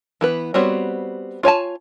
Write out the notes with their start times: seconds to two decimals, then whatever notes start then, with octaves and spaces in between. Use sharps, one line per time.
0.21 E3 B3 B4
0.54 G3 B3 C4 F#4 C#5
1.43 F4 C#5 G#5 A5